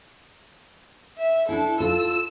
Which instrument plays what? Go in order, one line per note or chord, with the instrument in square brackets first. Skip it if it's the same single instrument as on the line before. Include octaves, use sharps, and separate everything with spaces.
[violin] E5
[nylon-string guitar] D4 E4 [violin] A4
[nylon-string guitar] F4 A4 A5 [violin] E6